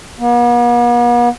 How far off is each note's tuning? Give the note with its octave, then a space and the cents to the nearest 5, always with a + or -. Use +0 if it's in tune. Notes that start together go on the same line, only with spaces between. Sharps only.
B3 -45